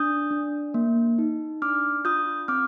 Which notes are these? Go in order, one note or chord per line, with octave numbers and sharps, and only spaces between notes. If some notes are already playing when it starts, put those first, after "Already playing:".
Already playing: D4 D#6 G6
D4
A#3
D#4
D4 D6 F6
F4 D#6 G6
C4 D6 F6